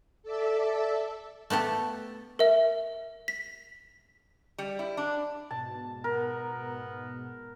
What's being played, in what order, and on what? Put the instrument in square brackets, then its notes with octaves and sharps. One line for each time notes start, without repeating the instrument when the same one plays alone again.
[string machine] A4 D5 E5
[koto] A3 B3 G4 A4
[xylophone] A#4 E5
B6
[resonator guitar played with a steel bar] G3
E4
D4
[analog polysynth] G#2 B2 [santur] A5
[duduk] B3 [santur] A#4